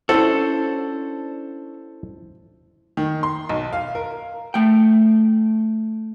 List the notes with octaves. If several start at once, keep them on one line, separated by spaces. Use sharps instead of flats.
C#4 D4 E4 F#4 A4 C5
D#3
C6
B1
F5
A#4
A3 G5